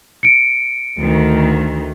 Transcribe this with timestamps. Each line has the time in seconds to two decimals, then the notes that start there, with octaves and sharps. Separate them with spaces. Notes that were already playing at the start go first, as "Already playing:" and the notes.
0.23 C#7 D7
1.00 D2 D#3